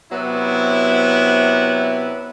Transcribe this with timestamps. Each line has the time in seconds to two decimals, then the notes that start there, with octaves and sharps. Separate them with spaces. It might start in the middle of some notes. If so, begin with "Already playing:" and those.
0.11 C3 F#3 B3 E4